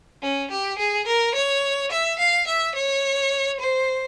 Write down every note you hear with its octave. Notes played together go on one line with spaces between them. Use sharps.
C#4
G4
G#4
A#4
C#5
E5
F5
E5
C#5
C5